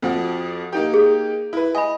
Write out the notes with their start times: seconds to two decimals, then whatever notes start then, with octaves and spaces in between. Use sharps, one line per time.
0.02 F2 F3 F#4
0.72 A#3 D#4 G4
0.94 G#4
1.53 E4 B4
1.75 D#5 G#5 B5